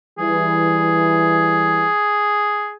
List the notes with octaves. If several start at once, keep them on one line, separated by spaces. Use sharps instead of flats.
E3 G3 G#4